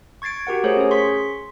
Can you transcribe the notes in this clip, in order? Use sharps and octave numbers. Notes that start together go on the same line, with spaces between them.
C#6 G#6 A6 C7 D7
F#4 G4 A#4 F#5
A3 G#4 A#4 C5 C#5
C#4 G#4
C6 C#6 B6